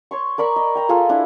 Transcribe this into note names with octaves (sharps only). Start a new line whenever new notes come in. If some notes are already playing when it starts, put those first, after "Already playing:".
C#5 C6 C#6
A#4 D5 B5 C#6
D#5
G5 A#5 B5
F4 G#4 A4 F5
D4 E4